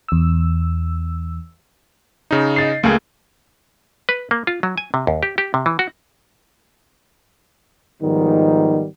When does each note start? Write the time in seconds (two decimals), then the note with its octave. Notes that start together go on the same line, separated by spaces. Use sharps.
0.08 E2 E6
2.31 C#3 D#4
2.56 D#5 A6 C7
2.83 C#2 A3 A#3 G#4
4.09 B4
4.31 A#3
4.47 F4
4.63 F#3
4.78 G#5
4.94 C3
5.07 D#2
5.23 G4
5.38 G4
5.54 C3
5.66 E3
5.79 F#4
8.02 G#2 D#3 F3 G3 B3 D#4